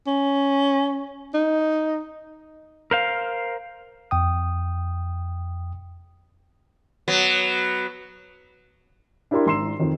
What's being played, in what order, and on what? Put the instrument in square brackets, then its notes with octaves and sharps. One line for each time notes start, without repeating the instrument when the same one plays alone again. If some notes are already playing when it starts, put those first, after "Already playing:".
[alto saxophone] C#4
D#4
[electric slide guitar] A#4 C5 F5
[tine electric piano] F2 G5 D#6
[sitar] F#3 B3
[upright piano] D4 E4 G4 A#4 E5 C6
G#1 A#5 C6 E6 C7 E7
F2 D#3